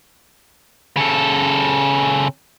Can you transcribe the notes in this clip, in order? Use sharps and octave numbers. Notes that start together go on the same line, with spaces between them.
C#3 A4